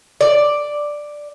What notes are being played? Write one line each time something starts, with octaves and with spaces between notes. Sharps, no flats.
D5